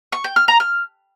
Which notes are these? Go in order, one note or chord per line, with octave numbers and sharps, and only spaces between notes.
C#6
G5
F6
A#5
F6